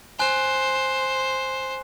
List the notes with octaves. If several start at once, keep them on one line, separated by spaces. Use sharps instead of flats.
C5 G#5 F#6